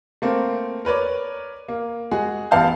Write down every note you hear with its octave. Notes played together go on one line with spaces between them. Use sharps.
A3 A#3 C4
A#4 B4 C#5 D5
A#3
G#3 F#4 G#4
A1 B3 F5 A5 G6